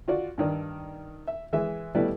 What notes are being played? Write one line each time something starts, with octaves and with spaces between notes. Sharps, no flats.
F4 F#4 D5
G2 D#3 D5
E5
E3 G#3 E5
B2 G3 A3 E4 B4 D5